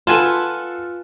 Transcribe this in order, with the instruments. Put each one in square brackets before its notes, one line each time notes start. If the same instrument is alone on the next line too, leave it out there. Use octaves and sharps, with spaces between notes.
[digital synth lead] F4 [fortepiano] A4 F#5 C6 [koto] B4 G#5 A5